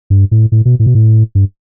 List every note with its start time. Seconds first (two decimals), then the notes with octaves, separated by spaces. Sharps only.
0.10 G2
0.31 A2
0.52 A2
0.65 B2
0.79 A2
0.86 B2
0.95 A2
1.35 G2